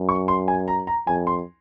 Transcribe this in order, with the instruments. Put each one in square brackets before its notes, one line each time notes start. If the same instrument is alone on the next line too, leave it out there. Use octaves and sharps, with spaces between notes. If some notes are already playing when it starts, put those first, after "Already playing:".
Already playing: [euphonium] F#2
[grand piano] C#6
C6
G#5
A#5
A#5
[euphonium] F2 [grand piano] G#5
[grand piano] C6